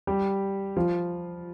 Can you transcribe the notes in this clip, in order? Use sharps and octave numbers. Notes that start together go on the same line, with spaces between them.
G3 G4
F3 F4